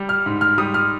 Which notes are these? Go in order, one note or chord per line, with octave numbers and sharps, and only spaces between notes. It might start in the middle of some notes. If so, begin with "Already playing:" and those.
Already playing: G3
F6
G#2
F6
G3 D#6
F6